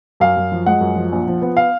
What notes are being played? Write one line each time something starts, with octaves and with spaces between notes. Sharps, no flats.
F#2 F5
F#2
F3
G#3 F#5
F#2
F3
A#1
F3
B3
F5